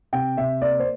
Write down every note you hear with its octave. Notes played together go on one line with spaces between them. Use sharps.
C3 G5
C3 E5
A#3 D5
C5